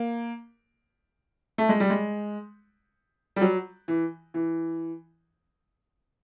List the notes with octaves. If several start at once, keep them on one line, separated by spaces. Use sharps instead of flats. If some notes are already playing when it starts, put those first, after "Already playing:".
Already playing: A#3
A3
G#3
G3
G#3
G3
F#3
E3
E3